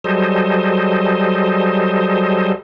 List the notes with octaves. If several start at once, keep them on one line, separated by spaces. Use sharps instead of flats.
F#3 G3 G#4 A4 C5 D#5